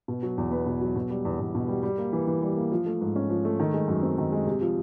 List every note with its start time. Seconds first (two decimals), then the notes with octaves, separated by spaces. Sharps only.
0.08 B2
0.23 F#3
0.38 E2
0.51 B3
0.66 B2
0.81 F#3
0.96 B2
1.10 G3
1.25 E2
1.40 E2
1.55 B2
1.68 G3
1.83 G3
1.98 A#3
2.13 E3
2.27 E3
2.42 G3
2.57 A#3
2.72 F3
2.86 A3
3.01 G#2
3.16 C#4
3.29 F3
3.45 A3
3.60 D#3
3.74 G#3
3.88 F#2
4.03 C4
4.18 D#3
4.32 G#3
4.47 C3
4.61 F3